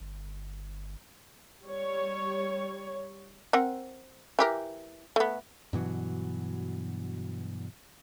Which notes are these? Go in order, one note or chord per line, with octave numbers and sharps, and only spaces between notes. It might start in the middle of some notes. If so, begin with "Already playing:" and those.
G1
G3 C#5
C4 A#4 F#5
E3 G4 A#4
A3 B3
G2 B2 E3 F#3